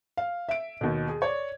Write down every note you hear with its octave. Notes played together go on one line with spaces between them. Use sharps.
F5
E5 D7
D#2 B2
G#4
C#5 D5